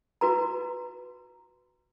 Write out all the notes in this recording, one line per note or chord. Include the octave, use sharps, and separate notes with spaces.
F#4 B4 A#5